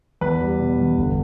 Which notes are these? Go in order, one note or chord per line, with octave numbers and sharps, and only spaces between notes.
E2 B4
G3
B2
E2
G1